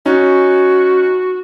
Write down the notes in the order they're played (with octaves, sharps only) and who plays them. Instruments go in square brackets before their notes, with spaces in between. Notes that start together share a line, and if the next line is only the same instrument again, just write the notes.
[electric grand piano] C#4 D#4 [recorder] F#4